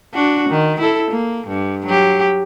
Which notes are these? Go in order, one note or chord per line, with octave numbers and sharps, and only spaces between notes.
D4 F#4
D#3
E4 A4
A#3
G2
F#3 G4